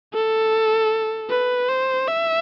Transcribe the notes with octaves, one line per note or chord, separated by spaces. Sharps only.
A4
B4
C5
E5